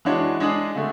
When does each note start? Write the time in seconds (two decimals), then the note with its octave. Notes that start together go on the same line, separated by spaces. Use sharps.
0.05 E3 G#3 D4 F#4 C#5
0.40 G#3 D4 G#4
0.76 D3 A3